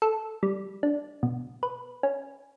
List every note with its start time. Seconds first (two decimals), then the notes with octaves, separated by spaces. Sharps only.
0.02 A4
0.43 G3
0.83 D4
1.23 B2
1.63 B4
2.03 C#4